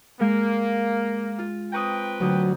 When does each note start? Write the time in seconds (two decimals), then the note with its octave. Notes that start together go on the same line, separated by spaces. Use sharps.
0.20 G#3 A#3
1.39 F4
1.73 C4 B4 G5 A#5 C#6 D#6
2.20 D2 F#3 D#6 G6